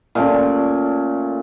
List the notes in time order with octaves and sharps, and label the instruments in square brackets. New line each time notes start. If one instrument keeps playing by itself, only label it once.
[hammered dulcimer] A#2 A3 C#4